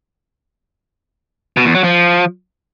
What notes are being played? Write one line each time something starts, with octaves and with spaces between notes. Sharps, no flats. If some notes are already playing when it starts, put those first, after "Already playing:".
B2
E2
F#3
F3